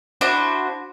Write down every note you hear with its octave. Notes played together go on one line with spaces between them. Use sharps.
D4 E4 F#4 C5